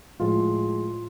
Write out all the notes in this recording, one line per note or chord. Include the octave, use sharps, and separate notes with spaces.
A2 F3 G#3 F4